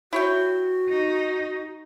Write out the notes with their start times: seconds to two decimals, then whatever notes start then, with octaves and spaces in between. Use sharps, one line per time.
0.13 E4 F#4 C#5 G5
0.88 D#4